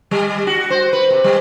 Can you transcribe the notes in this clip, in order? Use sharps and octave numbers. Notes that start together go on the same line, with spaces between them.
G3
F#4
C5
B4
C3
G3